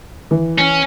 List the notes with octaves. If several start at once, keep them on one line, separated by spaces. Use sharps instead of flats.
E3
C#4